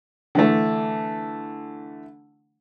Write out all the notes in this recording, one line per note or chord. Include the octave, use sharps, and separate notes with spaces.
D3 E3 A3